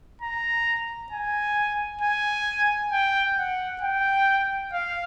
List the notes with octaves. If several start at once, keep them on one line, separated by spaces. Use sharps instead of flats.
A#5
G#5
G#5
G5
F#5
G5
F5